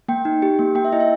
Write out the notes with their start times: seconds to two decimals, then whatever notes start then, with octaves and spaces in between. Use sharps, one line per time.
0.08 A#3 G5
0.25 D#4
0.42 G4
0.59 A#3
0.75 A#3 G5
0.85 E5
0.92 E4 D#5
1.00 E5